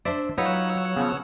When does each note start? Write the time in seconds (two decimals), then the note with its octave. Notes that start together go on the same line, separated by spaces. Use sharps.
0.05 D4 C5 D5 E5
0.38 F#3 D#4 F4 B4 C#5 F#5 E6
0.97 C#3 F3 B3